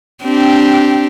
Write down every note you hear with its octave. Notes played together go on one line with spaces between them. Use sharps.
C4 D4 G4